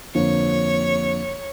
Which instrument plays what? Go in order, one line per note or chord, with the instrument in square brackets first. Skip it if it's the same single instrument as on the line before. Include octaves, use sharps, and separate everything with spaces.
[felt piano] F2 D3 A#3 [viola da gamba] C#5